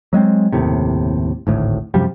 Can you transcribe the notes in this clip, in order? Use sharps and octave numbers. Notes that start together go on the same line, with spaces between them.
F#3 G#3 B3 C4
F#1 D#2 A2 C3
G#1 D2 A2
F#2 C3 F3 G3